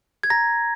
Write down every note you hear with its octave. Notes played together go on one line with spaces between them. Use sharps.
G#6
A#5 A#6